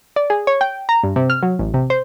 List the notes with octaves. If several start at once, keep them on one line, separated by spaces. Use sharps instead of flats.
D5
G#4
C#5
G5
A#5
G2
C3
F6
F#3
A1
C3
C5